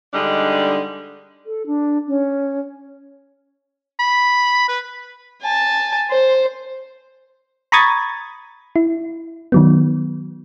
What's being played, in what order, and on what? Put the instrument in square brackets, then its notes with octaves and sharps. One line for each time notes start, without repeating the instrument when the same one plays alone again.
[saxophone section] D3 G3 G#3 D4 D#4
[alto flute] A4
D4
C#4
[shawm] B5
B4
[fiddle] G#5 A5
C5
[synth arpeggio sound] A#5 B5 C#6 D#6 G#6 A6
E4
D#3 F#3 B3